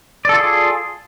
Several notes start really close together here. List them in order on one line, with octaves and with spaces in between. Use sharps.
D5 A4 F4 G#4